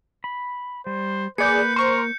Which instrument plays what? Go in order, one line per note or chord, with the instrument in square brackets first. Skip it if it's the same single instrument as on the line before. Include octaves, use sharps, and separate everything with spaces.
[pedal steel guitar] B5
[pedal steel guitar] G3 [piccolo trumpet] C5
[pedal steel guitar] A#3 [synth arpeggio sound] G#4 D5 [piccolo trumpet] B4 [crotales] G6 C#7
[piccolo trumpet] A#4 [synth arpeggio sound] C5 C#6